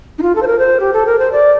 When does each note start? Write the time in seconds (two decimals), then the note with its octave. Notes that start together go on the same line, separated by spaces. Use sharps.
0.18 D#4
0.22 F4
0.35 A4
0.43 C5
0.47 A#4
0.59 C5
0.80 G4
0.93 A4
1.06 A#4
1.19 C5
1.32 D5